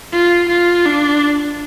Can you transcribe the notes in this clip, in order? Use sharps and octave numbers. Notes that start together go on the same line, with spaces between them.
F4
F4
D4